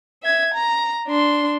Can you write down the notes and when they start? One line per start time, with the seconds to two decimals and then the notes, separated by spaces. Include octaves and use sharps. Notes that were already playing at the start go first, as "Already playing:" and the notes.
0.23 E5 G#6
0.54 A#5
1.08 D4 C6